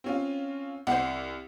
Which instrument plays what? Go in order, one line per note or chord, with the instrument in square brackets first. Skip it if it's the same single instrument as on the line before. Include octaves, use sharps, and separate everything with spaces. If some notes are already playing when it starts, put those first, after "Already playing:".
[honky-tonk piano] C4 C#4 F4
[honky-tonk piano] C2 [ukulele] C5 F#5